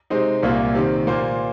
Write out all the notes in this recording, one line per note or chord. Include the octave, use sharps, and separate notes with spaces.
C3 G#3 C4 D#4
C2 A#2 A#3 F4
C3 D#3 C4
A#2 A#3 F4 C5